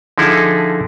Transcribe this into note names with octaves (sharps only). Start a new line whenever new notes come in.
D3 F3 D#4 E4 G#4 A4